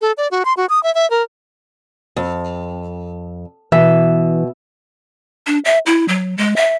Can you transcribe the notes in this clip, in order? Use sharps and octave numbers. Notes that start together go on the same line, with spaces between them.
A4
D5
F#4
C6
F#4
D#6
E5
E5
A#4
F2
B2 E3 E5
D4
E5
E4
F#3
G#3
E5